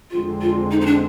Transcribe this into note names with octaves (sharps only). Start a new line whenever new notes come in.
F2 D3 G#3 C4 F4
F4
D#4
D#4
D4